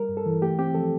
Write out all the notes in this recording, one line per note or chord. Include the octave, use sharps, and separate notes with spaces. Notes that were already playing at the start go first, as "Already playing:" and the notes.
Already playing: G3 A#4
G2
A4
E3
A3 G4
C4 G4
F3 A4